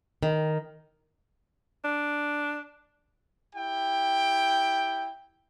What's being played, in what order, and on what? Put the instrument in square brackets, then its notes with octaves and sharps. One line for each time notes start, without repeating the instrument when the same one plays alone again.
[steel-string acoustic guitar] D#3
[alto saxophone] D4
[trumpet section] E4 G4 G5